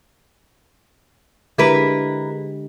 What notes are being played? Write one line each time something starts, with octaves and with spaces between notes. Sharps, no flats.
D3 G#3 E4 G4 A#4 B4